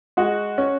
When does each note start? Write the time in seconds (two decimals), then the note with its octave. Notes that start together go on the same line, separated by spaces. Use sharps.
0.17 G#3 F#4
0.58 C#4